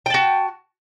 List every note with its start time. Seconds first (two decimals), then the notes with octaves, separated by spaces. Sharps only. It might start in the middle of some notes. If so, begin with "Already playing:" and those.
0.06 G5
0.10 A5
0.14 F#4